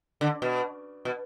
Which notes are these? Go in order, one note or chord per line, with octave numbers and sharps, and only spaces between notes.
D3
B2
B2